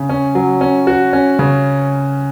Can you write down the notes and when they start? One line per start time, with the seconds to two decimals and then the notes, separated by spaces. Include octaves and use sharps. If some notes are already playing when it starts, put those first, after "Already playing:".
Already playing: C#3
0.09 C#4
0.35 F#3
0.61 C#4
0.87 F#4
1.13 C#4
1.39 C#3